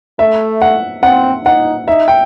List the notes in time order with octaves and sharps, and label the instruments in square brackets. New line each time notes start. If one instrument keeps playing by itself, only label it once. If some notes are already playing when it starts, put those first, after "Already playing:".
[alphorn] A3 [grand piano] E5
[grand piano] F#5
[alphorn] C4 [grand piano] F#5
[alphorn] D#4 [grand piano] F#5
[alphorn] D#4 [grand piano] E5
[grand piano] G5